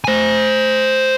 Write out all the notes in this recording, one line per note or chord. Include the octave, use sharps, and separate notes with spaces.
C5 G#5